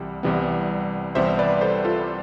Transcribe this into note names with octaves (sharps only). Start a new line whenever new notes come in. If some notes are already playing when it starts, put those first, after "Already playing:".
Already playing: C2 E3 G3
C2 C3 E3 G3 B3
C2 C3 E3 G3 B3 C5 E5
B4 D5
A4 C5
F4 A4